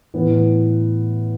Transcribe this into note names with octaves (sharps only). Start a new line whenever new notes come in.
A2 E3 B3